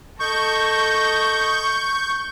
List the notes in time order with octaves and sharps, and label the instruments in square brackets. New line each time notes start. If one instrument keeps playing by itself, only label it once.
[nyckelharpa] A4 D#5 [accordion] C#6 G6